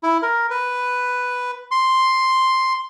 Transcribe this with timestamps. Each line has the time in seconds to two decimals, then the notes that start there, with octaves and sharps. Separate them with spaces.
0.03 E4
0.22 A#4
0.51 B4
1.71 C6